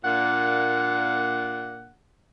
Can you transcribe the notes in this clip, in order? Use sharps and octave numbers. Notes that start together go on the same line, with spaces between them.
A#2 A#3 D4 F#5